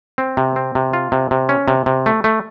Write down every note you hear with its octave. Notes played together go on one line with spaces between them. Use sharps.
C4
C3
C4
C3
F4
C3
C3
C#4
C3
C3
A3
A3